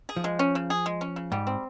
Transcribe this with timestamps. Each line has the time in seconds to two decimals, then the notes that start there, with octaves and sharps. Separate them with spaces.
0.09 G#4
0.16 F3
0.24 G#3
0.39 C#4
0.55 C#3
0.70 G#4
0.86 G#3
1.01 C#4
1.16 C#3
1.32 G#2 G3
1.47 C4